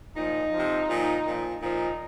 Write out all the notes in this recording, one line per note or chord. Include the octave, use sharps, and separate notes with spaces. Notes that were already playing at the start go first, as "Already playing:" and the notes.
A#2 F3 D#4
C3 F3
A#2 F3
A#2 F3
A#2 F3 D#4